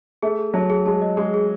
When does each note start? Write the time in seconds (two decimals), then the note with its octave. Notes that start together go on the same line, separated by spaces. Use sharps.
0.22 A3 G#4
0.39 G#4
0.54 F#3 A5
0.70 G#4
0.86 G#3 A5
1.02 D#5
1.17 G#3 G#4
1.34 G#4